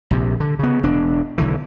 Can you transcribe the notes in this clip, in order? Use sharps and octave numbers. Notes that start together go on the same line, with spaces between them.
A#1 C3
D3
C#3 B3
E1 D4
B1 D3 E3